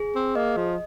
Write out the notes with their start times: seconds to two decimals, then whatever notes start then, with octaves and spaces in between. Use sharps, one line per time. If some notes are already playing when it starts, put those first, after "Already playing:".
Already playing: G#4
0.15 C4
0.35 A#3 D#5
0.57 F3